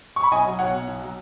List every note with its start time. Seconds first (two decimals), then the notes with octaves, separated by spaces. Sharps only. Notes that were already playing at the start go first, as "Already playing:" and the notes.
0.16 C#6
0.23 B5
0.31 B1 D#5 G#5
0.45 F#3
0.59 B1 C#5 F#5
0.73 B2
0.88 B1
1.01 F#3